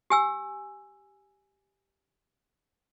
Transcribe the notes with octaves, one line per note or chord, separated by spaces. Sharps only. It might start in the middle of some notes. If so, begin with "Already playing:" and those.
G4 G#5 E6